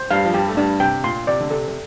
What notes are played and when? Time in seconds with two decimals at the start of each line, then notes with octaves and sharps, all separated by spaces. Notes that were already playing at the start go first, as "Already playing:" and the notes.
Already playing: C5
0.10 G2 G3 F5
0.25 F3
0.34 G2 G3 G4
0.48 A3
0.57 G2 G3 D4
0.80 C3 G5
1.04 A#2 C6
1.27 C3 D5
1.40 D3
1.50 C3 A4
1.68 C3